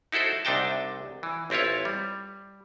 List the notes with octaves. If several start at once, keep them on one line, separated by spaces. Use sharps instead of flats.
D#4 E4 F#4 A4 C5
C2 C3 D4 D#4 G5 A5
E3
A1 C4 E4 F4 C#5
G3